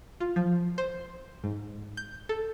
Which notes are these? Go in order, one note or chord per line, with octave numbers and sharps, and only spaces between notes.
F4
F3
C5
G#2
G6
A4